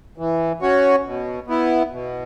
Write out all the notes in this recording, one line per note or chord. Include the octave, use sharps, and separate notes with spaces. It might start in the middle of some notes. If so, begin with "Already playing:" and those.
E3
C#4 F#4 C#5
B2
B3 E4
B2